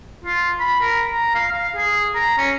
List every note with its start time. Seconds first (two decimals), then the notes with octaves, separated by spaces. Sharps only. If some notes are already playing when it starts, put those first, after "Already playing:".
0.25 F4
0.60 B5
0.81 A#4
1.06 A#5
1.35 F5
1.52 F5
1.76 G#4
2.15 A#5
2.38 C#4